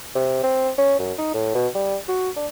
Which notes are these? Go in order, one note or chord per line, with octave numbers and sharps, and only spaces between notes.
C3
C4
C#4
F#2
D#4
A2
B2
G3
F#4
D4